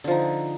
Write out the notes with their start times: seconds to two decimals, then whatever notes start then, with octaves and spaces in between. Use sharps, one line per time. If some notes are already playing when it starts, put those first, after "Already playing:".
0.04 D3
0.08 F3
0.11 D#4